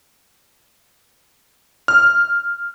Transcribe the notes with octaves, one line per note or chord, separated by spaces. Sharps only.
F6